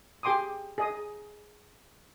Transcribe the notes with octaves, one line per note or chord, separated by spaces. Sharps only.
G4 G#4 G5 C6 D6 D#6
G#4 D#5 D#6